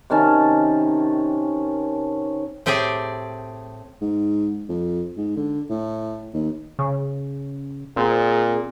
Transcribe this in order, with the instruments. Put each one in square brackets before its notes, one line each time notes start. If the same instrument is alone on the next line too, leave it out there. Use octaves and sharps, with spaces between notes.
[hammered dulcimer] C3 D#3 C#4 A5
[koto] A2 C4 G4 G#4 D5
[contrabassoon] G#2
F2
G#2
D3
A2
D#2
[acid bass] C#3
[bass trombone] A#2 [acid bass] C4 [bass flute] G#4